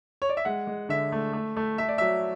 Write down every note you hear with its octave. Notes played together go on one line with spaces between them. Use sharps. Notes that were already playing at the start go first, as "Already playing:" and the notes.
C#5
D5
E5
G#3 F#5
G#3
D3 E5
A3
A3
A3
A3 E5
D5
F#3 E5